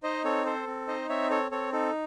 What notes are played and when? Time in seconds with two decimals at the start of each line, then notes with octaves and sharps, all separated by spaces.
0.03 D#4 C5 D#5
0.24 C4 A4 C#5
0.45 A4 C5
0.67 C4
0.88 D#4 C5 D#5
1.09 C4 C#5 E5
1.30 A4 C#5
1.51 C4 A4 C#5
1.72 D#4 A4